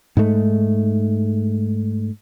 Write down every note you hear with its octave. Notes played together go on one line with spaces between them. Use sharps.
G#2 G#3 A3